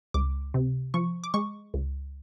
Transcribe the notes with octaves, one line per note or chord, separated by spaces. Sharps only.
C#2 D6
C3
F3 C#6
D6
G#3 C#6
C#2